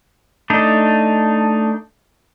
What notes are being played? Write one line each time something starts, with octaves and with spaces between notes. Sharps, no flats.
A3 D4 D#4